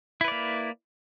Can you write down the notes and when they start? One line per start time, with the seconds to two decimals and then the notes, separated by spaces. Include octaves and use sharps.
0.21 E4
0.24 B4
0.28 D5
0.31 A#3